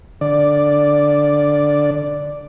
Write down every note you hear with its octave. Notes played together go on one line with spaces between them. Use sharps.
D3 D5